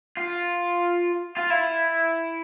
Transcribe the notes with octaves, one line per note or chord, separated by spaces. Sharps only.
F4
F4
E4